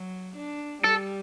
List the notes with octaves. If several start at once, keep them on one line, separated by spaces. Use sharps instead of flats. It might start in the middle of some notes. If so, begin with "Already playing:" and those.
Already playing: F#3
D4
G3 A4